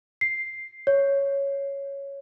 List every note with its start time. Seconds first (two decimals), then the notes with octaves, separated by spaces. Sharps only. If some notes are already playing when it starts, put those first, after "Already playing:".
0.21 C7
0.87 C#5